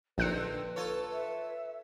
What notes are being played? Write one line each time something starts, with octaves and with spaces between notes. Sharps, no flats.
A#1 D3 C4 D#4 B4 F#6 C#7
F4 A4 C#5
E5